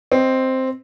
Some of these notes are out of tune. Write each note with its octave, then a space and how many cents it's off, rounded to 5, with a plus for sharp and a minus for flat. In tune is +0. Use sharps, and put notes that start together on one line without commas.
C4 +0 D#5 -5